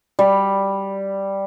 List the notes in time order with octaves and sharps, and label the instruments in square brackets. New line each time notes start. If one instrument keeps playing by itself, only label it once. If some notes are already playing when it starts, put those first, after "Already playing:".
[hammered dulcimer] G3